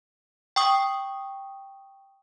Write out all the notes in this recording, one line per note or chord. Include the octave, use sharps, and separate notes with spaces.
G5 C#6 D#6